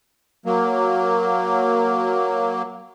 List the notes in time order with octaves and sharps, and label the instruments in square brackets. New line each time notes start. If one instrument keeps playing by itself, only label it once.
[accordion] F#3 A#3